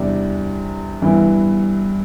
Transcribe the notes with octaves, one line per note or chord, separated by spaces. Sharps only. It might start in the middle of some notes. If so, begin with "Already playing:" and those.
Already playing: E2 C3 G3 D4
G2 E3 B3 E4